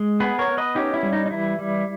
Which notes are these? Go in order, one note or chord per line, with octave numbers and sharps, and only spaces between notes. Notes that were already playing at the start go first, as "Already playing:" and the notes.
Already playing: G#3
B3 G#4 B4
A#4 C#5
B3
B4 D#5
C#4 D#4 G4
E4
G3
D#4
D#4
E3 E4
G3